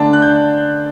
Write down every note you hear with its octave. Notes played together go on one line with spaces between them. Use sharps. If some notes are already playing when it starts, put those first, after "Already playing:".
Already playing: D3 A3 D4 A5
F#6
G6